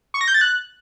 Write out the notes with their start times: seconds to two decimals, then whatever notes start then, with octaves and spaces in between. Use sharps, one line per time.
0.14 C#6
0.21 A#6
0.28 G6
0.34 A6
0.41 F#6